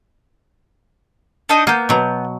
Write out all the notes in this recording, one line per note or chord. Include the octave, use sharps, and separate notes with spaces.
D4 D#4 D#5
A#3 B3 G6
B2 F#3